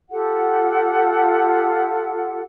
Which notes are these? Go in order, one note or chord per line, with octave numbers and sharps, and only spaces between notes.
F4 G4 A4 F#5